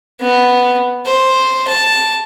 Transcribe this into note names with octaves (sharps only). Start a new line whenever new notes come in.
B3
C5
A5